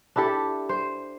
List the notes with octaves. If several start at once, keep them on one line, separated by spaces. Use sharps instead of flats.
D4 E4 G4 A4
C5